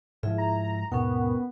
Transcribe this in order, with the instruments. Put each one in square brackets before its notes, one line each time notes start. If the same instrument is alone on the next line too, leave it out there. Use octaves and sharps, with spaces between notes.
[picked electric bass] G#2 F3 [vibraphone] E4 G#4 E5
[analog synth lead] A#5
[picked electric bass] D#2 G#2 B2 [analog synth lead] B3 [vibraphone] C#4 A#4 G5